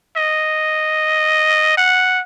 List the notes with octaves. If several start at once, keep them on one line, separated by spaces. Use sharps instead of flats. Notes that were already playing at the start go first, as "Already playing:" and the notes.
D#5
F#5